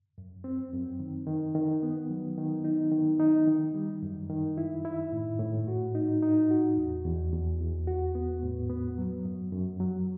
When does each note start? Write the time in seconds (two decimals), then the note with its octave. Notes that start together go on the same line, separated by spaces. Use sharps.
0.18 F#2
0.44 C4
0.73 F#2
1.00 D#3
1.27 D#3
1.55 D#3
1.83 B3
2.10 F#3
2.38 D#3
2.64 D#4
2.92 D#3
3.20 D#4
3.48 D#3
3.74 G3
4.03 F#2
4.30 D#3
4.58 E4
4.85 E4
5.12 A2
5.40 A2
5.68 F#4
5.95 D#4
6.23 D#4
6.51 F#4
6.77 E2
7.05 E2
7.33 E2
7.60 E2
7.87 F#4
8.15 B3
8.43 A2
8.70 B3
8.98 F#3
9.25 F#2
9.52 F#2
9.80 F#3